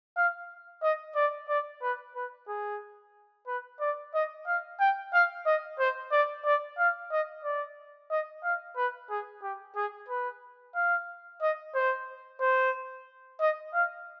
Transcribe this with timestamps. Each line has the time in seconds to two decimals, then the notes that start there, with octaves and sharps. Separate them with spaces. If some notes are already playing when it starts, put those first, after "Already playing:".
0.17 F5
0.82 D#5
1.16 D5
1.49 D5
1.82 B4
2.15 B4
2.48 G#4
3.47 B4
3.81 D5
4.14 D#5
4.47 F5
4.80 G5
5.13 F5
5.46 D#5
5.79 C5
6.12 D5
6.45 D5
6.78 F5
7.11 D#5
7.44 D5
8.10 D#5
8.44 F5
8.77 B4
9.10 G#4
9.42 G4
9.76 G#4
10.09 B4
10.75 F5
11.41 D#5
11.74 C5
12.41 C5
13.40 D#5
13.73 F5